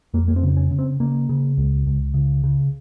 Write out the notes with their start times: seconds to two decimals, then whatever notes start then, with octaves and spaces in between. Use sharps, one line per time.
0.14 F2 A#3
0.28 A#3
0.36 C4
0.43 C#3
0.57 C#4
0.71 C#3
0.79 C4
1.00 C#3 A#3
1.29 C#3
1.57 C#2
1.87 C#2
2.14 C#3
2.44 C#3